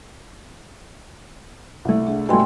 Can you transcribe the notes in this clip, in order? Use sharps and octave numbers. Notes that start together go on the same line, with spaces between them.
C2 A3
D4 G#4
G2 B2 A3 G5 G#5 C6